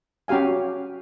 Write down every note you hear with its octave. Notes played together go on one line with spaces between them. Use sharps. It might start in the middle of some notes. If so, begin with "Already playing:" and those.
C#4 F#4 G4 F5 G#5